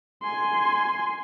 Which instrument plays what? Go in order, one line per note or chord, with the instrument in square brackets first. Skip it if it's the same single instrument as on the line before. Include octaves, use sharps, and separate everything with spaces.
[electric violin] G#5 C6